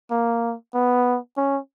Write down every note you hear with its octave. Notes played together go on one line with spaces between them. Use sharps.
A#3
B3
C#4